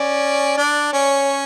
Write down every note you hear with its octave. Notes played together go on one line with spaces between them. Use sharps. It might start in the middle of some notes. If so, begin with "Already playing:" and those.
Already playing: C#4 D5
D4
C#4 C#5